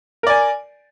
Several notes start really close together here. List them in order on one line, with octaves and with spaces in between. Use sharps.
A#4 D5 G#5